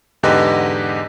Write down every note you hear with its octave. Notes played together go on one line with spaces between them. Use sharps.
E2 G#2 D3 G4 B4 D#5